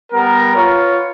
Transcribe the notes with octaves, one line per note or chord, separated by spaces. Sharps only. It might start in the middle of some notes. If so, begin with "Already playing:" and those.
G3 B3 A#4
F4 B4 C#5